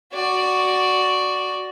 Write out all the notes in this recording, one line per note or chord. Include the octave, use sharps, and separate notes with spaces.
F#4 D5